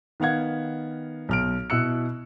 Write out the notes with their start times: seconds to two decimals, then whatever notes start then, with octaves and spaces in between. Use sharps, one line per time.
0.20 D#3 B3 F5 F#5 G#6
1.29 B1 F6 D7
1.70 B2 E4 E6 F#6 C#7